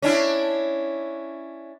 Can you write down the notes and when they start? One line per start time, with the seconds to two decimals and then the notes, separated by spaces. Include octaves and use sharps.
0.02 C#4 D4 E4